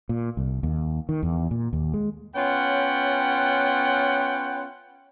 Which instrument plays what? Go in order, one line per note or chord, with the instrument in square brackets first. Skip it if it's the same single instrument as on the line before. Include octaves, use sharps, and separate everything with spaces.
[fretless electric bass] A#2
C2
D#2
D#3
E2
A#2
D#2
G#3
[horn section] B3 C#4 F4 C#5 F#5 G5